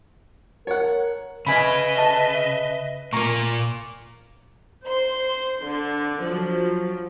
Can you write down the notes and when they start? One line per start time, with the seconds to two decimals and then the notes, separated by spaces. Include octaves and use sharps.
0.67 A#4 C#5 F#5
1.47 C#3 B4 D#5 E5 G#5 B5
1.98 A5
3.13 A#2 A#3 A#5 C#6
4.86 C5 C6
5.65 D3
6.22 F3 F#3